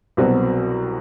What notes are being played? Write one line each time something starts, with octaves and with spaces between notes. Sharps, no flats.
C2 B2 F#3 C4 F#4